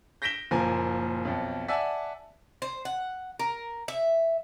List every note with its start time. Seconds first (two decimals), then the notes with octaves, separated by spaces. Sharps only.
0.22 G6 A#6 B6 D7 E7 G7
0.51 F#1 A#2 F3 A#4 G#5
1.25 B1 F2
1.68 D5 E5 F#5 G#5 A5 E6
2.62 C5
2.85 F#5
3.39 A#4
3.88 E5